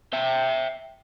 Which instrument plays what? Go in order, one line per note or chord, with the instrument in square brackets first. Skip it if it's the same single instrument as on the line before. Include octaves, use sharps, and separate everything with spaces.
[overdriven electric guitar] E5 G5